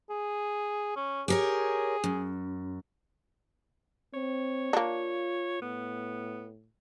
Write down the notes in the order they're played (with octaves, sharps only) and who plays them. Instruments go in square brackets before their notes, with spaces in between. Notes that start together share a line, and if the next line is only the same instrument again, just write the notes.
[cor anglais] G#4
C#4
[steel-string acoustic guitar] G4 A#4 C#5 [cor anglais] G#4
[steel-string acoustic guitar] F#2
[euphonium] C4 [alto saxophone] C#5
[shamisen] A#3 D4 [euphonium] F4
[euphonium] A2 [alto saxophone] B3